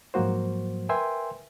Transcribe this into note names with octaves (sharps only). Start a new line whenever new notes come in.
G#2 F3 F#3 A#3 F#4 C5
A#4 B4 E5 G5 G#5 C6